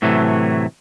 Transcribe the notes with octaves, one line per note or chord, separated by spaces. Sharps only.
A2 C3 E3 F#3 A3